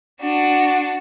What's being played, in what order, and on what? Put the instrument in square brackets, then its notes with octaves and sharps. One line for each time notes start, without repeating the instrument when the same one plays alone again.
[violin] D4 F#4